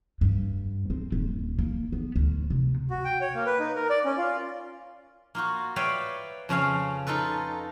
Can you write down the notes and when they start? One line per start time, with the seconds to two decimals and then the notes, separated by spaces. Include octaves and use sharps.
0.21 G2
0.90 C4
1.12 D#1
1.59 A#3
1.92 B3
2.16 D2
2.50 C3
2.90 F#4
3.05 G5
3.21 C#5
3.35 A#3
3.46 B4
3.60 D#4
3.76 A#4
3.90 D5
4.05 C#4
4.18 F4
5.35 A#3 F4 F#4
5.76 B4 C#5 D5 E5 F5 G5
6.49 F2 C#3 C#4 F5
7.07 D#4 F4 A4 B4